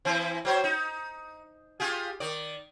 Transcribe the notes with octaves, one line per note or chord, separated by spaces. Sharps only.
E3 C4 E4
F#3 C5 C#5
D#4
F4 G4 G#4
D#3 D5